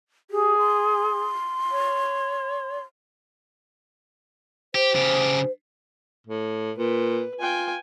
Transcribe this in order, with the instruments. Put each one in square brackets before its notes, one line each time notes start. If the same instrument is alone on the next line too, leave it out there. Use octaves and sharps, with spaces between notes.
[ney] G4 [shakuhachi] G#4
[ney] C6
[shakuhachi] C#5
[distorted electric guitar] G4 [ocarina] C5
[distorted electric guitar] C#3 G4
[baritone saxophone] A2
[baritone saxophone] A#2 [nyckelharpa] B4
[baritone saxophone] F4 [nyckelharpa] G5 G#5